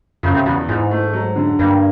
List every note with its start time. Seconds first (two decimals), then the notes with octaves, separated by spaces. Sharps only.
0.23 F#2 C#3
0.34 C3
0.46 E2 B2
0.68 G#2 E3
0.91 A3
1.13 F#3
1.36 D3
1.59 G2 A#3